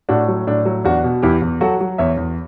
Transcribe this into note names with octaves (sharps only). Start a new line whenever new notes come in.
A2 D4 F#4
F#3
A2 D4
F#3
E2 D4 F#4
B2
E2 E4 G4
E2
F#3 F#4 A4
F#3
E2 C#5 E5
E2